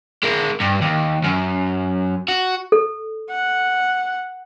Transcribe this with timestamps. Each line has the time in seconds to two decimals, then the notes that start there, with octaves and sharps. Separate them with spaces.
0.23 G#3 A#4
0.61 G2
0.82 D#2
1.24 F#2
2.28 F#4
2.72 A4
3.30 F#5